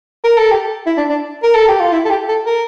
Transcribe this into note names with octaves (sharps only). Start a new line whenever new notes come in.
A#4
A4
G4
E4
D4
D4
A#4
A4
G4
F4
E4
A4
G4
A4
A#4